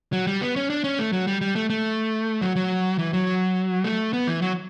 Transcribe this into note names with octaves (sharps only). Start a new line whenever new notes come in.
F#3
G3
B3
C#4
D4
C#4
A3
F#3
G3
G3
A3
A3
F#3
F#3
E3
F#3
A3
B3
E3
F#3